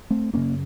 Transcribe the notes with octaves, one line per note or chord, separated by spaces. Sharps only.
A3 C4
F#2 C#3 A#3 C#4